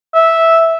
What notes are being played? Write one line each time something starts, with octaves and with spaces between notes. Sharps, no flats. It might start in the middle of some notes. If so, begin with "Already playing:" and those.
E5